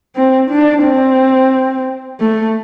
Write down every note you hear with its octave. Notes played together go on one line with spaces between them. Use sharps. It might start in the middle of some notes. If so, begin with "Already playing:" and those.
C4
D4
C4
A3